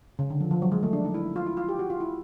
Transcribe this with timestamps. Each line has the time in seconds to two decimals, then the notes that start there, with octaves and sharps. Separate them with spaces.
0.19 C#3
0.30 D3
0.40 F3
0.51 F3
0.62 F#3
0.72 G#3
0.83 A3
0.93 D4
1.05 D#4
1.14 E4
1.36 F4
1.46 E4
1.57 F4
1.69 G4
1.79 F#4
1.90 F4
2.00 E4